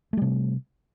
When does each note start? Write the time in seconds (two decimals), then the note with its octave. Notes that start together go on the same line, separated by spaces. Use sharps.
0.13 A3
0.17 G3
0.22 C3